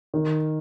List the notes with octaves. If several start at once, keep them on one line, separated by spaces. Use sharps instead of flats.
D#3